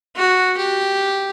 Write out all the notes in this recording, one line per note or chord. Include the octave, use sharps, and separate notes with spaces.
F#4
G4